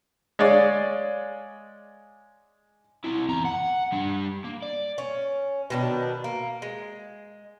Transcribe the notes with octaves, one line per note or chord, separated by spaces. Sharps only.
G#3 C#5 D5 F5
C4 E4
E2 A#5
F#5
G3 D4
A#3
D5
C#4
B2 D#3 D4
A#3
G#3